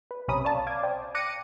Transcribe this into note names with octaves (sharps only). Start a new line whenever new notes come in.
B4
B1 C3 C#4 A#5 B5 D#6
C#5 D5 F5 A5
F5 D6 G#6
C5 D5 G5
D6 F#6 A#6 C#7 D#7